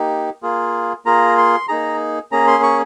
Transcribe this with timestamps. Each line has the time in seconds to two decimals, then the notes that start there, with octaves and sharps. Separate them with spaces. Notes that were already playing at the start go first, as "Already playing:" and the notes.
Already playing: A#3 D#4 G4
0.43 A#3 F4 G#4
1.05 A#3 F4 G#4 A#5
1.38 C6
1.68 A#3 D#4 G#4 A#5
2.32 A#3 C#4 G#4 A#5
2.47 C6
2.63 C#6